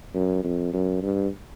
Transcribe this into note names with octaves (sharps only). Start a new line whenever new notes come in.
F#2
F2
F#2
G2